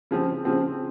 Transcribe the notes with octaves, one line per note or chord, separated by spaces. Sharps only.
C#3 F3 C4
C#3 F3 C4